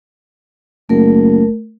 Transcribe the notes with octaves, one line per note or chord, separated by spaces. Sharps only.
F#1 A3 A#4